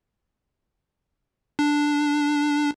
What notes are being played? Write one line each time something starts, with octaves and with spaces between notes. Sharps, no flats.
D4